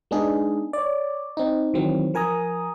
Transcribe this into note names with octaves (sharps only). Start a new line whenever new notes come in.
G#3 B3 D4 D#4 G#4
C#5 D5
C4 D#4
D#3 E3 F#3 C4
F3 A#4 G#5 A#5 D#6